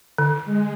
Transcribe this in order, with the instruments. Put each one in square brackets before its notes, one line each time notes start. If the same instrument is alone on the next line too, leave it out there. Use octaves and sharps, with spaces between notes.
[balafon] D3
[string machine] G#3